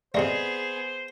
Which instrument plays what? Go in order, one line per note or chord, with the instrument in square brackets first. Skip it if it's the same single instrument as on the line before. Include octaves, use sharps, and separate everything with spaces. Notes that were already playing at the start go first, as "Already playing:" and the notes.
[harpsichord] C3 G#3 A3 [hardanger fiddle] B3 G#4 [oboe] C5 [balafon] D5